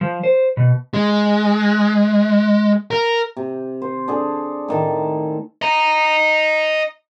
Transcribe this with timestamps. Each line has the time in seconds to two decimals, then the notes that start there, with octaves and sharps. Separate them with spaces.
0.01 F3
0.23 C5
0.57 B2
0.94 G#3
2.91 A#4
3.37 C3
3.82 C5
4.08 D4 G#4 A4
4.68 A2 D#3 A5
5.62 D#5 A#5